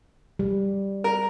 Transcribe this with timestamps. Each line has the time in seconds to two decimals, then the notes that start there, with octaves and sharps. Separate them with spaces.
0.39 G3
1.04 A#4